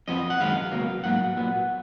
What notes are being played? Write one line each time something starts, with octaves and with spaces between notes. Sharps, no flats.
F2 F3 B3 D#5
F#5
F#2 D#3 G#3 B3 F5
C#2 B2 F#3 A#3
G#2 F#3 A#3 F#5
A#2 F#3 B3